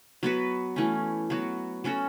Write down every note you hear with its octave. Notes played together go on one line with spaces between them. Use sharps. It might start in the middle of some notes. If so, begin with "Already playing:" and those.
F#3 B3 F#4 B4
E3 A3 C#4
F#3 B3 F#4
F#3 C#4 F#4 A4